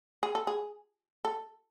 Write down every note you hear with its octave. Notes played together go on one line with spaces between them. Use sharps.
G#4
A4
G#4
A4